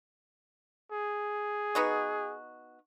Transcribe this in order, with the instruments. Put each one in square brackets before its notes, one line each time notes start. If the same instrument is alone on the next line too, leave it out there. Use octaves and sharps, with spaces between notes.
[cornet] G#4
[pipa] B3 D#4 F#4